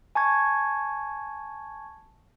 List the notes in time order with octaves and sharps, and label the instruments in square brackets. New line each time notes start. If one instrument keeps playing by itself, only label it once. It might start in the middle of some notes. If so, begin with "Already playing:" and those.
[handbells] G#5 A5 C#6 G#6